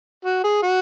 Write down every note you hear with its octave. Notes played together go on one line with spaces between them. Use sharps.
F#4
G#4
F#4